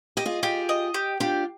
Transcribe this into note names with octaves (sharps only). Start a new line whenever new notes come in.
G4 D#5
F4 G#4
F4 G4 G#4
D#5
G4
D4 F4 G4